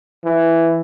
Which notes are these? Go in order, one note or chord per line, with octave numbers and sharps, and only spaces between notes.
E3